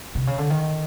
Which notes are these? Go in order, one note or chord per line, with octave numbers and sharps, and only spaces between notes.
C3
C#3
D3
D#3